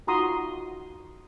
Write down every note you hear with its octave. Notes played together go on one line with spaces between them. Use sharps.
D#4 F4 F#4 A#5 C6 D#6